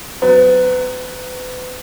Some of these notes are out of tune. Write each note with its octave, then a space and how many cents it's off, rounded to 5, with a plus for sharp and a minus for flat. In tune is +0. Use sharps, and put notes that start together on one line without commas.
F#3 +0 B3 +35